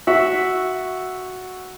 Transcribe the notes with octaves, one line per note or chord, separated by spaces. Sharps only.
F#4 E5